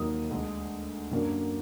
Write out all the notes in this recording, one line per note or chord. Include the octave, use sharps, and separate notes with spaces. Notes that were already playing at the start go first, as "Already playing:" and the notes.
Already playing: D#2 D#3 F#3 A#3 D#4 D#6
D2 D3 G#3
F#2 D3 F#3 A#3 D4